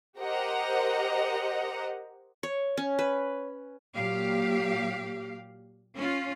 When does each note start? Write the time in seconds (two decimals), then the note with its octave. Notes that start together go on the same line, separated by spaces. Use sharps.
0.18 G4 A#4 C5 D#5 F#5 A#5
2.43 C#5
2.77 C#4
2.99 B4
3.95 A#2 F#3 G4 F5
5.96 C#4 F4